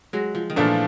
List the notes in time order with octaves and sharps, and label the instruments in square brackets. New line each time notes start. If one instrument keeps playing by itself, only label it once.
[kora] F#3 G#3
F3
D#3
[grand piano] A#2 F3 A3 D4 [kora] E3